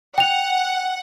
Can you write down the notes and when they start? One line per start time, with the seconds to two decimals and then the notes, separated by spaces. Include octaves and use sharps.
0.18 F#5 G5 F7